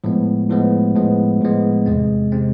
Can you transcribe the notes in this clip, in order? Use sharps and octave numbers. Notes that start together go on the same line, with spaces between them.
A2 F3 G#3 B3
A2 F3 G#3 B3
A2 F3 G#3 B3
A2 F3 G#3 B3
E2 C3 G#3 C4
C3 G#3 C4